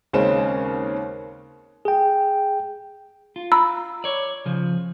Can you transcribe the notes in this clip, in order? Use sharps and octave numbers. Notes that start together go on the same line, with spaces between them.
D#2 C#3 G#3 C4 C#4 E7
G#4 G5
F4
A#5 B5 E6
C#5 D5
C#3 F3